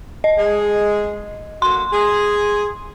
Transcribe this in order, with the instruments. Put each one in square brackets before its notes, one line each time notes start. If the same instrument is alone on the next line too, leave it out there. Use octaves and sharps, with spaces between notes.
[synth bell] D#5
[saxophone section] G#3 G#4
[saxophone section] D3 A#3 F#4 [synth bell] C6
[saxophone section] G#4